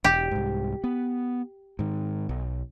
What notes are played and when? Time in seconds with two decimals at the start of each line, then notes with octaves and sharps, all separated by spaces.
0.04 E1 G4
0.31 C2 G#2
0.84 B3
1.79 G#2 D#3
2.29 B1